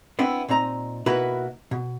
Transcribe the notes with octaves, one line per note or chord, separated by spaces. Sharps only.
B3 C4 D4 E4
A#2 C4 D#4 A#5
B2 A#3 D#4 E4 F#4 B4
B2